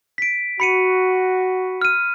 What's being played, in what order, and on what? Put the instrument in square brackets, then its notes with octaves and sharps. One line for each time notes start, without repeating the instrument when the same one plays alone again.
[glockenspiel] B6 D7
[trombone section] F#4 [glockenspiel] B5 C#7 D#7
[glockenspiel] F6 D#7